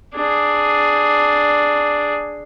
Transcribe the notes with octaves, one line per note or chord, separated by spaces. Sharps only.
D4 G#4